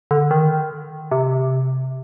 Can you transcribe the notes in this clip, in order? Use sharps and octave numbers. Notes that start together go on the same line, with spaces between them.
D3
D#3
C3